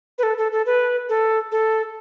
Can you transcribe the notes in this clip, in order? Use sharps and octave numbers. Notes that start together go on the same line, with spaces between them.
B4
A4
A4
A4
B4
A4
A4